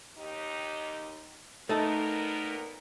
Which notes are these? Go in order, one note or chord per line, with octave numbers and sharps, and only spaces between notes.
D#2 D#4 G4
A#2 A3 B3 D#4 A4 A#4